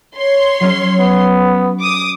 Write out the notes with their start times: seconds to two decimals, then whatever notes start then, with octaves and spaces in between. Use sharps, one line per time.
0.16 C#5 C6
0.61 F#3 C#4
0.99 B3
1.81 D6 D#6